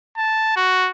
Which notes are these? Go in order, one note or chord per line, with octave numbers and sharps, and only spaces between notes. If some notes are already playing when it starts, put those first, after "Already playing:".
A5
F#4